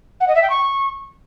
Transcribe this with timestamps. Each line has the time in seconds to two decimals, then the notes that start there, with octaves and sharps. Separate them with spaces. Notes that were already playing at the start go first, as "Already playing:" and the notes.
0.20 F#5
0.28 D#5
0.35 E5
0.42 G5
0.50 C#6